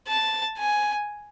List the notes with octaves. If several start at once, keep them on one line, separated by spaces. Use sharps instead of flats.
A5
G#5